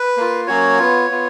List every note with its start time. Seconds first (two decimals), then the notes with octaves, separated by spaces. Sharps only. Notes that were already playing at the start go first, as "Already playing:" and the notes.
Already playing: B4
0.17 A#3 F4
0.47 F#3 A#3 C#4 F#4 C#5
0.78 B3 F4
1.10 B3 F4